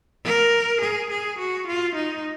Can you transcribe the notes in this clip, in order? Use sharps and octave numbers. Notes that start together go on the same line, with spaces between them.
A#4
G#4
G#4
F#4
F4
D#4